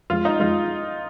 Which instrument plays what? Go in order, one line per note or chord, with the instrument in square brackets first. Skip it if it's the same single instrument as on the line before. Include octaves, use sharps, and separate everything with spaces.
[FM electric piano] F2 F3 G#3 [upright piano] F4
[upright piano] D#4
[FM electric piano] F2 F3 G#3 [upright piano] F4